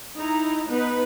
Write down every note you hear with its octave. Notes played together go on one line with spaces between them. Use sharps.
D#4 E4 A#5
B3 D#4 B4